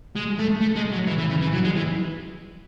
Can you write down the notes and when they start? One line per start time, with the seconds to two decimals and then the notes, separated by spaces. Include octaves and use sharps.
0.16 G#3
0.39 A3
0.61 A3
0.76 G#3
0.93 F#3
1.08 E3
1.19 E3
1.30 C#3
1.41 E3
1.53 F#3
1.64 G#3
1.76 E3